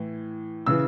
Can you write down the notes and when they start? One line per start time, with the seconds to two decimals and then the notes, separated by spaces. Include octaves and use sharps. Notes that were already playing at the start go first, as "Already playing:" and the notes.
Already playing: A2 E3
0.66 C#3 E3 E6